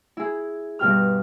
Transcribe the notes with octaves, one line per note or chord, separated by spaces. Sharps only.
E4 G#4
G2 B2 G4 F6